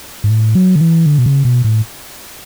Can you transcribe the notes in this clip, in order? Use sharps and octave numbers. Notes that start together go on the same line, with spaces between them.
G#2
A2
F#3
D3
E3
D3
B2
C#3
B2
A2